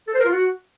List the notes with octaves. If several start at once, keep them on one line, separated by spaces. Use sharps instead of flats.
A4
C5
A#4
F4
F#4